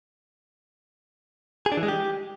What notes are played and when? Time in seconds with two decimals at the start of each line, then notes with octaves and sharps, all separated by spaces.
1.66 G#4
1.72 D4
1.77 E3
1.83 G#3
1.88 G4